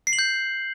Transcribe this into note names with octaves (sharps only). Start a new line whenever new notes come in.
C7
F#7
G6